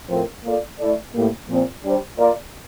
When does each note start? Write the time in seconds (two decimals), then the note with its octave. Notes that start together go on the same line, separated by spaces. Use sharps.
0.09 A2 F3 C4 F4 A#4
0.44 A#3 F4 A4 D5
0.79 A3 E4 A4 D5
1.14 A2 G3 A#3
1.49 A#2 F3 C4
1.84 G3 D4 G4 C5
2.19 A#3 F4 A#4 D5